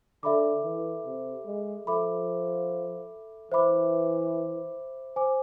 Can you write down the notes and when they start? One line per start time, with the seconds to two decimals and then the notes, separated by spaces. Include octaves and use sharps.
0.23 D3 A4 E5 B5 D6
0.64 E3
1.05 C3
1.46 G#3
1.87 F3 A4 E5 B5 D6
3.52 E3 C5 E5 B5 D6
5.16 C5 G#5 D6